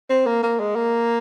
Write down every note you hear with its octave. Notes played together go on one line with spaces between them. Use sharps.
C4
A#3
A#3
G#3
A#3